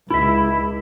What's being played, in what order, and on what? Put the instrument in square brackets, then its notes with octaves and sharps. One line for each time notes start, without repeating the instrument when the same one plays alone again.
[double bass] C#2 [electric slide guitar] E4 E5